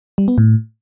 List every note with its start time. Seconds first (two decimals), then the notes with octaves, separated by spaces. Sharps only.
0.18 G3
0.28 B3
0.38 A2